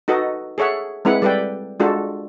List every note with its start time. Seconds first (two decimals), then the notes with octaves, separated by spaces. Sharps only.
0.08 D#4 F#4 A4 B4 D#5
0.58 G#4 A4 C#5 E5 F#5
1.05 G#3 C4 E4 B4 F#5
1.22 G3 A4 B4 D5 G5
1.80 G#3 D4 F4 F#4 A4